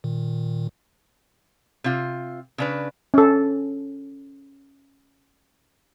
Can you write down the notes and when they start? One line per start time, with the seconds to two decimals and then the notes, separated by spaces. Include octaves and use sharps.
0.04 A#2 D#3
1.84 C3 F4
2.58 C#3 D4 B4
3.14 C#4 A4